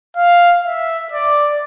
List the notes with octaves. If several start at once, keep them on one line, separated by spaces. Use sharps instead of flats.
F5
E5
D5